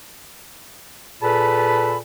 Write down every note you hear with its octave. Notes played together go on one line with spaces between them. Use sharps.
A#2 G#4 A4 B4 A5 B5